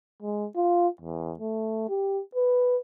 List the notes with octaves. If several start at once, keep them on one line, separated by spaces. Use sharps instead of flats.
G#3
F4
E2
A3
G4
B4